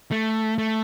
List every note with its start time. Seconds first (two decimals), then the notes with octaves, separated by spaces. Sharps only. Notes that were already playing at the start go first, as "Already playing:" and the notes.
0.11 A3
0.58 A3